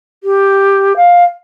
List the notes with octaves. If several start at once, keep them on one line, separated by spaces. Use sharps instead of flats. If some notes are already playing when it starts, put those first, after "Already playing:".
G4
F5